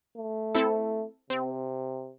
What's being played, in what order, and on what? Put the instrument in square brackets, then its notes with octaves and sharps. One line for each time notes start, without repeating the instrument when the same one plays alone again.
[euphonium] A3
[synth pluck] C4 E4 A4
[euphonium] C3 [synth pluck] C4